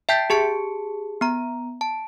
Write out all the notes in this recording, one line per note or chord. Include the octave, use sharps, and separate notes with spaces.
E5 G5 A5 G6 B6
G4 G#4 A5 C#7
B3 A#5
A5